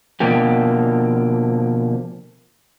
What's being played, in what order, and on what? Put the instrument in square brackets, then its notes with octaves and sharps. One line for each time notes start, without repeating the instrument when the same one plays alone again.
[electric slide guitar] B2 D3 F3 A#3 G4